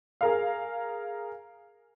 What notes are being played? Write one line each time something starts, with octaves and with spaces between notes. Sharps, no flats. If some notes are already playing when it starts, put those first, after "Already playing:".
G#4 A#4 F5